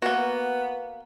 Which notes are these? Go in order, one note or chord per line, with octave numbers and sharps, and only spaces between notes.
A#3 B3 F#4